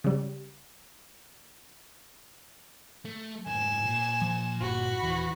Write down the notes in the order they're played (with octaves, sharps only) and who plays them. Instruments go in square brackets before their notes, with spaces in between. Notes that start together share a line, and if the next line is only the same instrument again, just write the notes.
[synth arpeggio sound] C#3 G3
[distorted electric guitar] A3
[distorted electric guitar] F2 G#2 [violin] G#5 E7
[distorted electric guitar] A#2
[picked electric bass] F3
[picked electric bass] G1 [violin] F#4 B5
[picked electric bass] D#1 [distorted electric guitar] E3